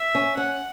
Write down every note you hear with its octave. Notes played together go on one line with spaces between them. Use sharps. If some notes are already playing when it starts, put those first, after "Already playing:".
Already playing: E5
C#4
C#4 F#5